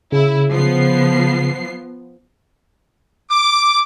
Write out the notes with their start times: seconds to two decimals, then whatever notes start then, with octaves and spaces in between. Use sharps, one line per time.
0.12 C#3 E4
0.51 F3 B3 C7
3.30 D6